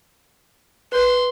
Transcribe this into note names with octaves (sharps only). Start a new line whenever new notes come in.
B4 C6 G6